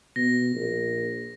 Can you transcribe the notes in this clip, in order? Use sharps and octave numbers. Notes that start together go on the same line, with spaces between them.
B2 A#6
A#1